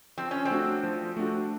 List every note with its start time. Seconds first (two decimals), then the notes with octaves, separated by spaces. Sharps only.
0.18 F3 C4
0.31 C#4
0.45 C4
0.50 A3 D4 F#4
0.83 F3
1.17 A3 D4 F#4